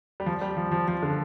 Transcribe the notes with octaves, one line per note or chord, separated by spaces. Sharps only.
G3
F3
G3
F3
F3
F3
D3